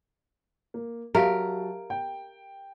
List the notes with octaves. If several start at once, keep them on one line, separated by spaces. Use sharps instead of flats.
A#3
F#3 G4 A#4 E5 F5 A5 D7
G5